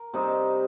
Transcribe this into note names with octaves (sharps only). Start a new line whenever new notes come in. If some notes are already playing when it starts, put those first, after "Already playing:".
Already playing: A#4
C3 G3 C4 D#4